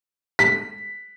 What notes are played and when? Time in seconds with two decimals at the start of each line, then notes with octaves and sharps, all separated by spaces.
0.39 B6